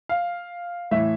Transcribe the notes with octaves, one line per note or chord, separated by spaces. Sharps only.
F5
A2 E3 E5